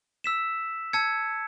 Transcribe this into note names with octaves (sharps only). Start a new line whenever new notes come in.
E6 B6 E7
A5 E6 G#6 C#7